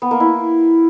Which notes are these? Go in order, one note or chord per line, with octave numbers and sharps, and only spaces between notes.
B3
A#3
E4